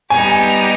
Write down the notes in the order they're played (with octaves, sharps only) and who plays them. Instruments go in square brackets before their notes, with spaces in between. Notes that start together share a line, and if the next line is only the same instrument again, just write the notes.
[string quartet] G3 B3 D#4 G4 [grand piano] G#5